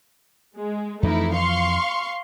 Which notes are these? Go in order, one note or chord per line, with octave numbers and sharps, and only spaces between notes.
G#3
F2 E3 F3 A3 D#4 E4
F5 C6 C#6